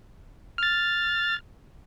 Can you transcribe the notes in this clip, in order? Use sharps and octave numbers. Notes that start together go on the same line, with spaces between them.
F6 A6